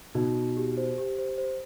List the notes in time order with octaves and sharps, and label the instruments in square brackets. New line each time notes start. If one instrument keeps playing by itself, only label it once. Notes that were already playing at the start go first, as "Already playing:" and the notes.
[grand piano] B2 [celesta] D#4
[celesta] D#4
G4
C5
G4
C5
C5